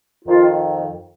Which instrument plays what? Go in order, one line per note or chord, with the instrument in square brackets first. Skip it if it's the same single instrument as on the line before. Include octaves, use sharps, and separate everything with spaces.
[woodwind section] F2 D#3 F4